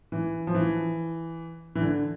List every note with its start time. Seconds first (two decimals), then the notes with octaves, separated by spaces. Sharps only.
0.12 E3
0.47 F3
0.55 E3
1.75 E3
1.81 D3